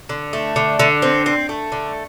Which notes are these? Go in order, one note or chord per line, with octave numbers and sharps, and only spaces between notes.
D3
A3
D3
D3
C4
C4
A3
D3